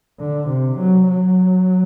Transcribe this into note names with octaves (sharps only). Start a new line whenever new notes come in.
D3
C3
F#3
F#3